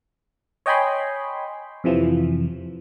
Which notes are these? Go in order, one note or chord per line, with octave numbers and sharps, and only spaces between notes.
C#5 D#5 G5 G#5 B5 C6
F2 C3 E3 F3